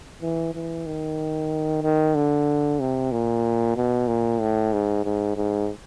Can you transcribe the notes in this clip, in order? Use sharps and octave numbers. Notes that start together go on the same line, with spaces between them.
E3
E3
D#3
D#3
D3
C3
A#2
B2
A#2
A2
G#2
G#2
G#2